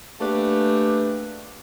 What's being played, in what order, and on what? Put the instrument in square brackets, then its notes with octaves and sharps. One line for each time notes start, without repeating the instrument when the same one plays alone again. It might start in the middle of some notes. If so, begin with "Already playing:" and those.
[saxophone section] A3 A#3 D4 G4 G#4 B4